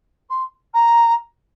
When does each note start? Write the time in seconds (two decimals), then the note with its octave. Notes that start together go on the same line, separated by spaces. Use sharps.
0.29 C6
0.74 A#5